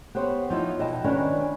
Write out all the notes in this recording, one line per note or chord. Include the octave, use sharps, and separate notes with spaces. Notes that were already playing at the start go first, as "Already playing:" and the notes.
B3 G4 C5 C#5
F3 D#4 E4
B2 D#5 G5 A5
D#3 C#4 D4 B4